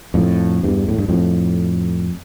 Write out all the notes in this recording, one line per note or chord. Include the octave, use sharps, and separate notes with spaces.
F2 A2
E2 G2
A2
G2
F2 A2